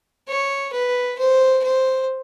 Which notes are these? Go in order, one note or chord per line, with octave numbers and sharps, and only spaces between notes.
C#5
B4
C5
C5